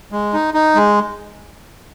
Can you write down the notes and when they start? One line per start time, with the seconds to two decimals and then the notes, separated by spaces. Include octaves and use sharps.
0.12 G#3
0.33 D#4
0.54 D#4
0.75 G#3